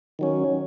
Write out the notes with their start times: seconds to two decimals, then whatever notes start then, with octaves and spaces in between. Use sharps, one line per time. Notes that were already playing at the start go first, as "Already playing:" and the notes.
0.19 D#3 F#3 C#4